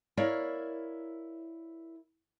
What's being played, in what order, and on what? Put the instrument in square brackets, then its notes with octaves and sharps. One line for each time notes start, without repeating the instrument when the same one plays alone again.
[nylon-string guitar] E4 A#4 C#5 D5 F5